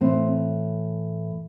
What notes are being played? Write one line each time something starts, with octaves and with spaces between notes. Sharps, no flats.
A2 E3 C4